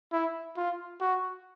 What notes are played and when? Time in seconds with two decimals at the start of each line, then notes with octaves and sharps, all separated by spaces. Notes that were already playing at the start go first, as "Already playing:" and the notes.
0.12 E4
0.57 F4
1.01 F#4